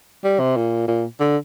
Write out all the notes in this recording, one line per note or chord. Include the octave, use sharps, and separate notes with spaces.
G3
C3
A#2
A#2
D3